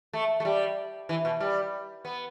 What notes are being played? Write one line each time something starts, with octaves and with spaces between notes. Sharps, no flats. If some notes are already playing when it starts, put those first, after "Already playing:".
A3
A3
G3
E3
B2
G3
B3